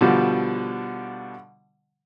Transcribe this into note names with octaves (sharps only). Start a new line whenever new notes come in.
B2 D3 F3 G3